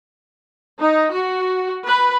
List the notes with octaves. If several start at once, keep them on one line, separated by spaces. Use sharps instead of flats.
D#4
F#4
B4